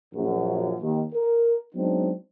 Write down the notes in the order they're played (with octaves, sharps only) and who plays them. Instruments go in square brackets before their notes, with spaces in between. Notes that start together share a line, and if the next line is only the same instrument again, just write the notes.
[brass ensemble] A#1 F#2
D#2
A#4
F#3 G#3 B3 C4 D4 D#4